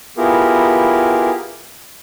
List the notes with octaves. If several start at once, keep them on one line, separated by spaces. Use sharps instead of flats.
B3 E4 F4 G4 G#4 A#4